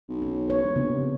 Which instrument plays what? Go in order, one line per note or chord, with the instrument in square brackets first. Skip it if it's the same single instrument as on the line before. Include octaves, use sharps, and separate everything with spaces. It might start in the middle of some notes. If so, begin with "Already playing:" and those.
[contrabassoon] B1
[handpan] C#4
B4 C#5
[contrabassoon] E1
[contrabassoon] A#1 [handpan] C#3 B3
[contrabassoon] C3